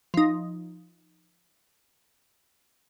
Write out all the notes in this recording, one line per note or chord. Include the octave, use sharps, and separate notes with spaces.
F3 D#4